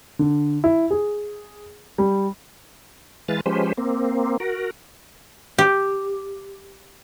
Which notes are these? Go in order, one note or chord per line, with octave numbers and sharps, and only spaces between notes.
D3
E4
G#4
G3
E3 G#3 B4 F5 A6
F3 G#3 C#4 G4 B4 C5
A#3 C4
F#4 A#4
G4